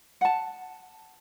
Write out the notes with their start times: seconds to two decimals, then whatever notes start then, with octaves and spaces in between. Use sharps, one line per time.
0.21 F#5 A5